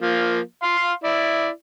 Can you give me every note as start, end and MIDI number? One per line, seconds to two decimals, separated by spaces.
0.01 0.40 53
0.01 0.40 58
0.63 0.92 77
0.63 0.92 84
1.04 1.49 64
1.04 1.49 74